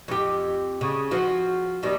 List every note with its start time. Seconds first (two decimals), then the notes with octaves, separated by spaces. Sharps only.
0.08 F2 G4
0.81 C#3
1.11 F3 F#4
1.83 D#2 D#3 G3